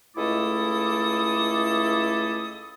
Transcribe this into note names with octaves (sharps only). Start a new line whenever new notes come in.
C#2 A3 E4 A4 D6 D#6